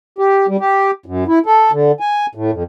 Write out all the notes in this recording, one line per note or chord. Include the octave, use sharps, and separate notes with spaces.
G4
G3
G4
F#2
E4
A4
D3
G#5
A2
F2